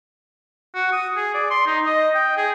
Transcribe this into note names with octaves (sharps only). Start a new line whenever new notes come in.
F#4
D#6
G#4
D5
C6
D#4
D#5
G5
G#4